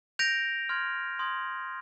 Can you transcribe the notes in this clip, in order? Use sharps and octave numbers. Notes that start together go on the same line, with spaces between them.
G6 A#6 D7 F7
C6 F6 G#6
C6 D#6 G#6